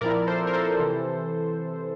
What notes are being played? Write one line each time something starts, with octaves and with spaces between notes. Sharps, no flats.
A#2 F3 C4 E4 A#4 D5
A4 C5
A#4
A4 C5
C3 E3